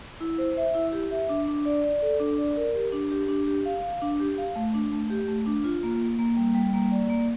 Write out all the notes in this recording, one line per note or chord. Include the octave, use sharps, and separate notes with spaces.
E4
C5
E5
E4
G4
E5
D4
D4
D5
D5
A4
D4
D5
A#4
G4
D4
G4
D4
G4
F5
F5
D4
G4
F5
A3
D4
A3
G4
A3
D4
F4
A#3
A#3
A#3
G3
G3
A#3
D5
A#3